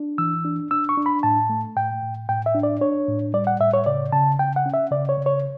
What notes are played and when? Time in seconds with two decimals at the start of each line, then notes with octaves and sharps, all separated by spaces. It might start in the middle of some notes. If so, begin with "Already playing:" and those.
Already playing: D4
0.18 E3 E6
0.45 D4
0.71 D4 E6
0.89 C#6
0.97 D4
1.06 B5
1.23 A2 A5
1.49 A3
1.76 A2 G5
2.03 A2
2.29 A2 G5
2.46 E5
2.55 D4
2.63 D5
2.81 D4 C#5
3.08 A2
3.34 G3 D5
3.47 F#5
3.60 A2 E5
3.74 C#5
3.86 C#3 D5
4.12 C#3 A5
4.39 C#3 G5
4.56 F#5
4.66 C#4
4.74 E5
4.91 C#3 D5
5.09 C#5
5.18 C#3
5.26 C#5